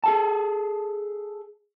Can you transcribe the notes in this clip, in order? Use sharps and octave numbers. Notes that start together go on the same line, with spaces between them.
G#4 A4 A5